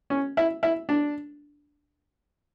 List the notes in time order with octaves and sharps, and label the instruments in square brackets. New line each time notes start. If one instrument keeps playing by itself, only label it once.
[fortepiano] C#4
E4
E4
D4